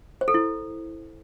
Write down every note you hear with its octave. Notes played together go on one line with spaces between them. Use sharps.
C5
A4
E4